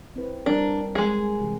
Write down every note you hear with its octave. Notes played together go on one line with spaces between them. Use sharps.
C4 E4 B4
G3 C4 D4 A#4
G#3 G#4
C3 E3 G4